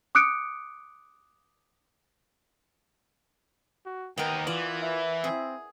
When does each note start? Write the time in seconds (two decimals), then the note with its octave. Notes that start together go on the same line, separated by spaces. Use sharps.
0.15 D6 D#6 F#6 C#7 D7
3.86 F#4
4.18 D#2 B3 D#4 A#4 G5
4.47 E3 F4 D5
4.82 E4
5.24 C4 G#4